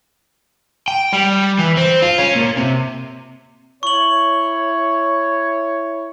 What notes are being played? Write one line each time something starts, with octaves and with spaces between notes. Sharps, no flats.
G5
G3
E3
C4
F4
C#4
A#2
C3
E4 C#5 C#6 F#7